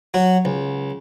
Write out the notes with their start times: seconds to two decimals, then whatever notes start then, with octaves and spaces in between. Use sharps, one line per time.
0.14 F#3 F#4
0.45 C#2